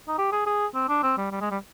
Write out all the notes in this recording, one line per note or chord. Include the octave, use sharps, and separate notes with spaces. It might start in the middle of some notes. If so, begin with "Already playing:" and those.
D#4
G4
G#4
G#4
C4
D4
C4
G3
G3
G#3
G3